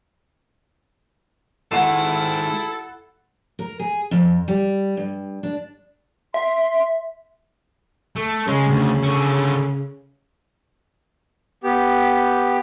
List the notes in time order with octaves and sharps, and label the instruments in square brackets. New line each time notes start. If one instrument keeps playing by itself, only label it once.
[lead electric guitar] D#3 G#3 [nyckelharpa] E4 [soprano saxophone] A4 [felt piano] F#5 C7 E7
[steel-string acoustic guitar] A#4
G#4
F2
G3
G2
D4
[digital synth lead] E5 [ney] C6
[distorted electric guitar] A3
[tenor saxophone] C#3 [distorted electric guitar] G#3
[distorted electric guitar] D2
D3 C#4
[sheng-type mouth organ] B3 G4